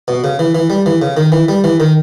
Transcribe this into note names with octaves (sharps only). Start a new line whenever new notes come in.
B2
C#3
E3
E3
G3
E3
C#3
D#3
E3
G3
E3
D#3